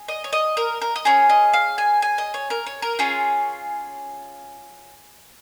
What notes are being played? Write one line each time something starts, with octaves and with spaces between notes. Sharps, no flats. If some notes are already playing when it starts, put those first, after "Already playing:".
Already playing: G#4
D#5
C#5
D#5
A#4
A#4
D#5
C#4 G#4 C#5
D#5
F5
G#5
G#5
D#5
C#5
A#4
C#5
A#4
C#4 F4 G#4 C#5